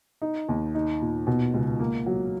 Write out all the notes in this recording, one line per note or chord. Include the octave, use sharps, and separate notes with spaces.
D#4
D#2
D#4
A#2
B2
C#2
A#3
F#3